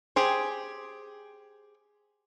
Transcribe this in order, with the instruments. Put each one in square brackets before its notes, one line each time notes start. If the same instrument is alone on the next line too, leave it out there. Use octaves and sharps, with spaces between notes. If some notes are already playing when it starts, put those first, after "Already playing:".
[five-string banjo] G4 G#4 C5